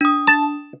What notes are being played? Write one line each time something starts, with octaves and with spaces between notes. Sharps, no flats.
D4 D#6
A5